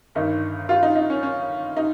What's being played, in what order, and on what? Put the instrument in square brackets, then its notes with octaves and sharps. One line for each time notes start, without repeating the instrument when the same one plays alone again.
[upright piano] G1 G2 D#3 D#4
F4
D#4
D#4
C#4
C#4
D#4